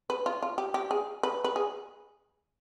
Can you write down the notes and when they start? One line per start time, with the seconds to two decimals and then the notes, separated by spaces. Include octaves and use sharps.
0.10 B4
0.26 F4
0.43 F4
0.58 G4
0.74 G4
0.91 G#4
1.23 B4
1.44 B4
1.56 G#4